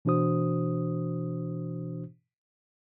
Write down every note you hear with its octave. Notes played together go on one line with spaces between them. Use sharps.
B2 E3 D4 F#4 C5 D#6